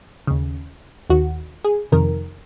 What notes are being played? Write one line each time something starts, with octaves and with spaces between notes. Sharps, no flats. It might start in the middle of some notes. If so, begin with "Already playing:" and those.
D#2 C#3
D#2 D#3 F#4
G#4
F2 C3 D#3 A#4